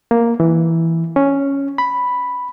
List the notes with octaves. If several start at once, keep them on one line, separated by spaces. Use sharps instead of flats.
A#3
E3
C#4
B5